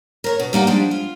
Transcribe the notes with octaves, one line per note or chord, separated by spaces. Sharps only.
A#4 C5 C#5
B2
G3 A#3 D#4 F#5
F3 G3 G#3 D4
F4